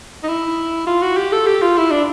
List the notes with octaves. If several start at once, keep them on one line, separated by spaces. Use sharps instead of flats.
D#4
E4
F4
F#4
G4
A4
G4
F4
E4
D4